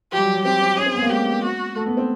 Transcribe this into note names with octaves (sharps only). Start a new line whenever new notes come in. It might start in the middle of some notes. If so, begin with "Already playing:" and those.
F3 G4
G3
F#3
F#3
C4 G4
C4
C#4 G#4
C4
B3
A#3
G#3 G4
F#4
A3
B3
C4